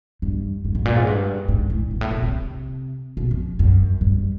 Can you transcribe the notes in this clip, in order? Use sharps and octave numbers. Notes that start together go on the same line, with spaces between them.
G2
G#2
G#2
A#2
G#2
G2
G#2
A2
G#2
A2
B2
C3
B2
F2
F#2
G2